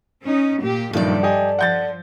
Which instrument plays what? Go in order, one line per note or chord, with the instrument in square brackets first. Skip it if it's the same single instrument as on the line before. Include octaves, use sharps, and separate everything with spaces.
[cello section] C#4 D#4
A#2 A#3 G4
[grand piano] F#1 A#2 D#3 [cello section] G2 F3 G3 [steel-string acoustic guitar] A4 D5
[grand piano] G4 D#5 G#5
[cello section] F3 [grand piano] F#5 G6 A6